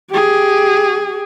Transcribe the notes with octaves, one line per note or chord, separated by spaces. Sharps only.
G4 G#4